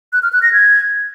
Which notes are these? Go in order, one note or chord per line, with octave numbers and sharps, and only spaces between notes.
F#6
F6
F#6
A#6
G#6